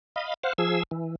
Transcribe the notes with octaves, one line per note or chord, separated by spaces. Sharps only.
D#5 F5 B5
C5 F5 F#5
F3 G#4 E6
E3